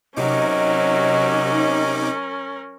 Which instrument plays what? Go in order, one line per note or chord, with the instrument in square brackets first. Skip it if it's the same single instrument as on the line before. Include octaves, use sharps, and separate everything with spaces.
[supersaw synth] C3 D#4 D6 [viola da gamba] F#3 [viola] C#4 A#4 [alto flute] D#5